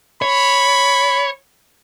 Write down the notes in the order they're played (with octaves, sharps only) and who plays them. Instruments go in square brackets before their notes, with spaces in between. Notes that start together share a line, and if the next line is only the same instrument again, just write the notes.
[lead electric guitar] C#5 [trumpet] B5